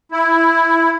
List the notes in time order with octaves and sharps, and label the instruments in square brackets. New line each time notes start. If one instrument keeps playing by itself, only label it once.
[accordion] E4